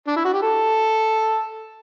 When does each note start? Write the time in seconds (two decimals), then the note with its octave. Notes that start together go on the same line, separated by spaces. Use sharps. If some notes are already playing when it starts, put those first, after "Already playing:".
0.08 D4
0.16 E4
0.25 F#4
0.34 G4
0.42 A4